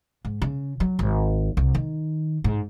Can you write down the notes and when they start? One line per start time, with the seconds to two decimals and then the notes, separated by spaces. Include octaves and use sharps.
0.25 G#2
0.42 C#3
0.80 F#3
0.99 G#1
1.57 C2
1.75 D#3
2.44 G#2